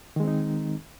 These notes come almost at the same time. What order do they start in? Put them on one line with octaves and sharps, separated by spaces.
D#3 G#3 C4 D#4